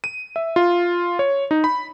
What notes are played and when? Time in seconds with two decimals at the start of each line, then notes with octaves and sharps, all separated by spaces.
0.04 D#7
0.36 E5
0.56 F4
1.19 C#5
1.51 D#4
1.64 B5